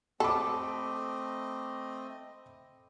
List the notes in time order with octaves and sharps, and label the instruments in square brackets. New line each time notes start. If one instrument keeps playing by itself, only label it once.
[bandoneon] A3 C4 D#5 [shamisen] A4 [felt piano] B5 D6